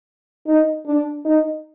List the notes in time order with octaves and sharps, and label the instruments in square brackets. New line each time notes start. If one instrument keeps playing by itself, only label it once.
[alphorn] D#4
D4
D#4